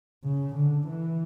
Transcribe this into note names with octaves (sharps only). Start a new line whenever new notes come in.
C#3
D3
E3